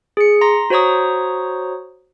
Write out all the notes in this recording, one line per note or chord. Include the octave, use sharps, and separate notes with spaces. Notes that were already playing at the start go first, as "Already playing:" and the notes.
G#4 C#7
A#5 C6 A#6
F#4 C5 C#5 A#5 C#6 D#6